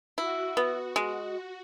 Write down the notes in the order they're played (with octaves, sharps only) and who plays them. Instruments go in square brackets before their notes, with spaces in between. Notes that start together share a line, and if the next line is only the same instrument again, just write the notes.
[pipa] E4 [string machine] F#4
[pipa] B3
G#3